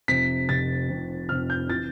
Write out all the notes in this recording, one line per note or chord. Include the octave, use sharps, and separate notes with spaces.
F1 F2 C3 B6
F1 F2 C3 A6
F1 F2 C3
F1 F2 C3 F6
G6
C3 E3 A6